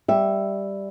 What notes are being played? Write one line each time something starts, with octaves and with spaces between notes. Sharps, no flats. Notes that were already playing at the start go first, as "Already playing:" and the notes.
G3 E5